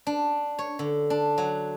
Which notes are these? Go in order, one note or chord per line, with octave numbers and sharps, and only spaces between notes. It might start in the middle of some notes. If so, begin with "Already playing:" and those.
D4
C#5
D3
D4
F#3